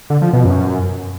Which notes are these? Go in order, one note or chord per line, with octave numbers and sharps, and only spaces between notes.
D3
F3
B2
F#2